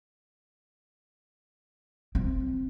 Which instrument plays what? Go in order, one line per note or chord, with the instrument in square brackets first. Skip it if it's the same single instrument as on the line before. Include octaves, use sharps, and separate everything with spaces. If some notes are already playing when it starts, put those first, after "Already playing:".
[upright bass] C4